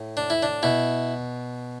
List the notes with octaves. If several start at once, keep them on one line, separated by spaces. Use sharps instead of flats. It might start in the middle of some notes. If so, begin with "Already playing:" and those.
Already playing: A2
D4
E4
D4
B2 E4